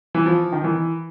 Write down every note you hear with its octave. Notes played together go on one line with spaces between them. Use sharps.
E3
F3
D#3
E3